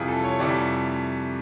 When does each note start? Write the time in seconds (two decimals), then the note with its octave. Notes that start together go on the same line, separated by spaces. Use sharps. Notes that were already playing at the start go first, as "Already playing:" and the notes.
Already playing: F2 C3 E3 G3 F4 G#4
0.08 A4
0.24 C#5
0.40 F2 C3 E3 G3 D5